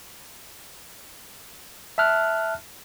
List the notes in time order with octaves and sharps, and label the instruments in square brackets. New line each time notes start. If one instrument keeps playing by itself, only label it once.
[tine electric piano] E5 A5 F6 F#6